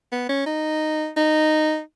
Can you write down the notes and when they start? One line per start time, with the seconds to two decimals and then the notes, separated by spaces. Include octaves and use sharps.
0.12 B3
0.29 C#4
0.46 D#4
1.16 D#4